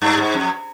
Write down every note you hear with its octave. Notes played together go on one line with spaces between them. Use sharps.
G2
G#2
F2